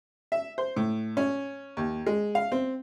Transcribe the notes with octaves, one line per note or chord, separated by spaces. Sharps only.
E5
C5
A2
C#4
D#2
G#3
F5
C4